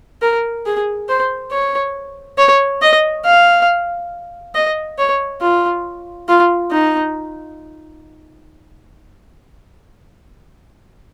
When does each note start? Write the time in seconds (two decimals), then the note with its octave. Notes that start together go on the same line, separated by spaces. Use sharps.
0.22 A#4
0.66 G#4
1.09 C5
1.52 C#5
2.38 C#5
2.82 D#5
3.25 F5
4.55 D#5
4.98 C#5
5.41 F4
6.29 F4
6.71 D#4